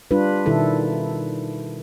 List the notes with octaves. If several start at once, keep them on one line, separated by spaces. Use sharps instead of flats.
G3 D4 F4 B4
B2 D#3 E4 A4